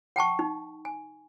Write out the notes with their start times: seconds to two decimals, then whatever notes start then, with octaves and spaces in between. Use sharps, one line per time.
0.16 F#5 G5 A5 C#6
0.39 D#4
0.85 G#5